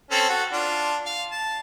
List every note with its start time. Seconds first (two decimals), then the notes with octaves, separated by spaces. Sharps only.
0.11 C4 C#4 A4
0.29 F#4 A4
0.52 D4 F4
1.06 F5
1.32 A5